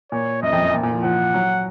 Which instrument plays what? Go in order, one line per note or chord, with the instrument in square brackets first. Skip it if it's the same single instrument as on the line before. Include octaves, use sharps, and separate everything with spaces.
[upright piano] A#2 [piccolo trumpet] C#5
[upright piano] F#2 [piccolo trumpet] D#5
[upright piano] F2
F#2
A#2
A#2
F3
[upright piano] F3 [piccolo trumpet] F#5
[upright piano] F#3